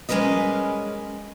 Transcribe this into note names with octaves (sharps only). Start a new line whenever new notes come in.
G3 G#3 C#4 A#4 B4 D#5